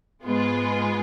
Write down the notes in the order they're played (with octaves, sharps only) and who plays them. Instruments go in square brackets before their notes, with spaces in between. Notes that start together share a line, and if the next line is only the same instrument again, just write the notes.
[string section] G#2 G#3 B3 F4 G#4